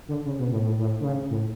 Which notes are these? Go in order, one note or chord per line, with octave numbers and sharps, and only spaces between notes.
D3
C#3
B2
A2
A2
A2
D3
C#3
A2